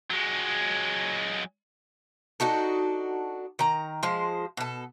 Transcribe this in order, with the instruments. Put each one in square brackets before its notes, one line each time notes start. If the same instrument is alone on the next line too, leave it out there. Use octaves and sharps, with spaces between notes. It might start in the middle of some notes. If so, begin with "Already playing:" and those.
[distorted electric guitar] F#3 G#3
[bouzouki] D4 D#4 F#4 A4
D#3 A#5
F3 G#3 C5
B2 A4